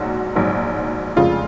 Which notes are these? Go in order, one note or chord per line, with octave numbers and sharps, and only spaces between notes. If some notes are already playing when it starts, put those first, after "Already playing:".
Already playing: A#1 G#2 F#3 F#4
A#1 G#2 F#3
F1 F2 C#3 G#3 F4